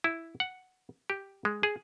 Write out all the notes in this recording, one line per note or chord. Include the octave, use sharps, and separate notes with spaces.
E4
F#5
G4
G#3
G#4